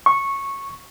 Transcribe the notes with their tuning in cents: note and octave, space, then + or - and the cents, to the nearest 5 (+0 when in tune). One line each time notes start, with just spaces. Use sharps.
C#6 -10